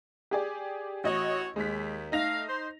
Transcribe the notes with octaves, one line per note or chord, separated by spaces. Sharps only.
G4 G#4 D5
A1 F#4 C#5 D#5
D#2 G#3 B6
A3 D#4 F5 A#6 F7
C5